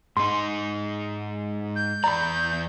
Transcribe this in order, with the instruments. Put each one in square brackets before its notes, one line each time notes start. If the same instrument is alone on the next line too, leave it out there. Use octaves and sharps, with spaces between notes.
[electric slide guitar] G#2 D#4 [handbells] C6
[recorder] G6
[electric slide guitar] E2 D5 [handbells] A#5 B5